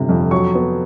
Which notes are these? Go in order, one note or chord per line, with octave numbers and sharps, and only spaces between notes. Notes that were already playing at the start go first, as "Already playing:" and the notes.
Already playing: G1 C3
F2
F#3 C#6
B3